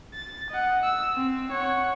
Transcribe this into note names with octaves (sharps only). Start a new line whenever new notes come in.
A6
D#5 F#5
E6
C4
C#5 F#5